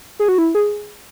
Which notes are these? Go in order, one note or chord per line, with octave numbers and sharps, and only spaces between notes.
G#4
F#4
E4
G#4